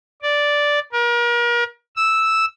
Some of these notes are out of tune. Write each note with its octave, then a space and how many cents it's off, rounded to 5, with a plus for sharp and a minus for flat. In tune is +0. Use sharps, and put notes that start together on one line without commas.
D5 -5
A#4 +35
E6 -5